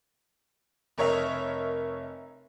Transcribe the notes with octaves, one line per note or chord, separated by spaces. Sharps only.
F1 A#4 C#5 D#5 E5 F7